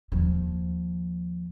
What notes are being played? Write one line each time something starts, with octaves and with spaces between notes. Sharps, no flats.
D#2 F3